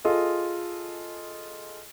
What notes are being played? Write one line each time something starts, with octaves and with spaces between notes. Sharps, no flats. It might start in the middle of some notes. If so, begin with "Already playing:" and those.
F4 G#4 A4 D#5